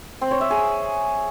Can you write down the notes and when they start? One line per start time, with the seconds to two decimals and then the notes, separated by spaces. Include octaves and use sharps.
0.21 C4
0.31 C#5
0.41 E5
0.51 G#4